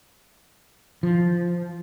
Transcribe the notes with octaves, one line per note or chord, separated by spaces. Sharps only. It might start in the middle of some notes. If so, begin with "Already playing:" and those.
F3